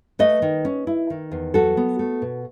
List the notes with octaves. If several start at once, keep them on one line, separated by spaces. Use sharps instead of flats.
A3 B4 D#5
D#3
C#4
E4
D#3
E2
F#3 F#4 A4
B3
A3
B2